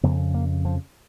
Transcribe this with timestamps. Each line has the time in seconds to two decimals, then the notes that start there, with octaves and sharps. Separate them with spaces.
0.03 F2 C#3 B3
0.34 A#3
0.65 F3